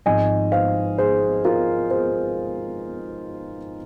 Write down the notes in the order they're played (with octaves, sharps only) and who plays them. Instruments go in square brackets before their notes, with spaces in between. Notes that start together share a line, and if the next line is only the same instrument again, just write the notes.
[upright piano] G#1 G#2 F3 D#5 G#5
C5 F5
G#4 C5
F4 A#4
G#4 C5